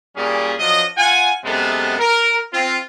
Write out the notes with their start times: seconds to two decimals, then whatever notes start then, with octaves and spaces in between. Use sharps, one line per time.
0.17 A#2 G3 C#4 G#4
0.59 F3 F#3 D4 D#5
0.97 F4 F#5 G#5
1.45 F#2 C3 G#3 B3 A4
1.99 A#4
2.53 C4 F4